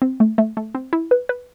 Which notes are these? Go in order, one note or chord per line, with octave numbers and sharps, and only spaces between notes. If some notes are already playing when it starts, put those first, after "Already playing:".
C4
A3
A3
A3
C4
E4
B4
B4